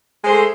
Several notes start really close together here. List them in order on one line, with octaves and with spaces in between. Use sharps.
G#3 C5 A3